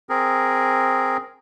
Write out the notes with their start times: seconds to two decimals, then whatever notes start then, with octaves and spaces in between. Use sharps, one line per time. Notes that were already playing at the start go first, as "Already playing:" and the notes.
0.09 C4 G#4 A#4